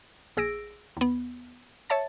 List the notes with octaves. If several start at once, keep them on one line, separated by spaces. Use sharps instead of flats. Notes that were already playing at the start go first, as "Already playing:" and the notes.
A#1 G#4 E6 A#6 D7
D#2 B3
C#5 E5 A5 A6